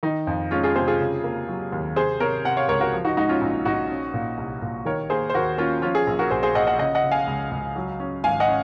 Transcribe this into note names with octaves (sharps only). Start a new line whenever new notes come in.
D#3 D#4
F2
G#3 C#4 F4
F4 G#4
C3 G#4 C5
F4 G#4
C#3
A#3
F#3
D#2
C3 G#4 C5
C3 A#4 C#5
C3 F#5
C#5 F5
C#2 A#4 C#5
F#4 A#4
F3
D#4 F#4
G#2 D#4 F#4
C#4 F4
A#1 D#4
A#1 D#4 F#4
C#4
A#2
C2
A#2
D#3 A#4 C#5
A#3 G#4 C5
C5
D#2 F#4 A#4
A#3 C#4 F4
F3 C#4 F4
F4 G#4
A#1
F#4 A#4
A#1 G#4 C5
G#4 C5
A#1 D#5 F#5
D#5 F#5
C#3 D#5 F#5
D#5 F#5
C#3
F5 G#5
C#2
C#2
F#3
C#4
G#1 F5 G#5
D#5 F#5
C#4